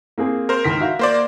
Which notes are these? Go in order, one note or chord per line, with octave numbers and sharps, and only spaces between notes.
A#3 C4 G#4
A#4 C5
C#2 D#3 B6
F#4 E5 F5
A#3 C5 D5